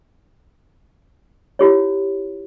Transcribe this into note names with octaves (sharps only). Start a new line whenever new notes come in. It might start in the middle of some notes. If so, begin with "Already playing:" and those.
E4 F4 G4 C#5